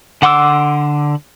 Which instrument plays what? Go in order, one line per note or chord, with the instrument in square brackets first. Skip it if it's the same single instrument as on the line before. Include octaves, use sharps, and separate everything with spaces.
[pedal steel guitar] D3 F#5 C6 D6 E6